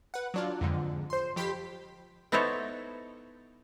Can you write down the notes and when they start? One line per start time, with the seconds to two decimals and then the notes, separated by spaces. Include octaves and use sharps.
0.14 B4 F#5
0.34 F#3 D4 F4
0.61 F2 G#2 D3
1.10 C5 C6
1.36 F2 G4 B5 C6 G6 B6
2.32 B3 D#4 E4 A4 C5 C#5